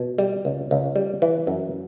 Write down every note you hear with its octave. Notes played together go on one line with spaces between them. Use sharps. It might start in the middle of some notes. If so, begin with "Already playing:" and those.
Already playing: B2
G3
C#2
C#2
G3
E3
F#2